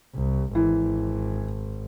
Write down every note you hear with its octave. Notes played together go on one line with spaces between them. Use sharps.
C2
G#1 E3